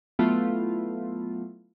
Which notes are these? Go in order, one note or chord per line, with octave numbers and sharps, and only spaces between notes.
F#3 A3 B3 E4 F4